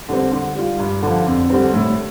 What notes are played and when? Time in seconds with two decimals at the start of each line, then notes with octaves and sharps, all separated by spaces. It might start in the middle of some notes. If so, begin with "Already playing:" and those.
0.09 D3 G3 C4
0.32 D3
0.55 G3 F4
0.79 G2
1.02 D3 F3
1.26 F2
1.50 D3 G3 C4
1.73 A2